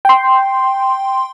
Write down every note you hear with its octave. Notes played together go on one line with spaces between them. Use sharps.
G5 C6